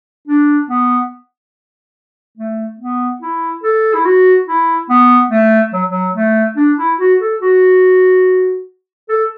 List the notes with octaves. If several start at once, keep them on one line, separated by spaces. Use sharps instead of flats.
D4
B3
A3
B3
E4
A4
E4
F#4
E4
B3
A3
F#3
F#3
A3
D4
E4
F#4
A4
F#4
A4